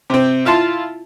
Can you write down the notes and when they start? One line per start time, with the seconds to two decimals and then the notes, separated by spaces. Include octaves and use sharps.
0.10 C3 C4
0.45 E4 F4 A5 C6